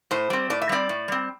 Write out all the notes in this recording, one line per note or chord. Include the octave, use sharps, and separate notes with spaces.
A2 C5
G3 C4
A2 D5
E5
G3 C4 D5
A2
G3 C4